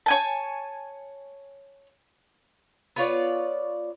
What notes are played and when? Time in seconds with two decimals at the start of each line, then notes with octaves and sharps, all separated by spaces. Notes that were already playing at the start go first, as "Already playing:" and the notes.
0.06 C#5 G#5 A5
2.96 B3 F4 C#5 D5